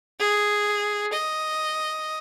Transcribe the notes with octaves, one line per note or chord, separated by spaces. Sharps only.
G#4
D#5